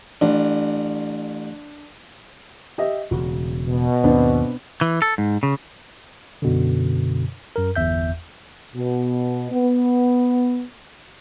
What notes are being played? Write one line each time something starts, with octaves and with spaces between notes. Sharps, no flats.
A1 D4
G4 D#5 E5
E1 C#3 F#4
B2
D#2 G#2 B3 C4 D4
E3
A4
G#2
C#3
F#2 B2 D3
F#2 A#4
G1 E2 E5 G6
B2
B3